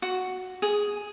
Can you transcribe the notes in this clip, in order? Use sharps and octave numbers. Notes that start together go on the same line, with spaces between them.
F#4
G#4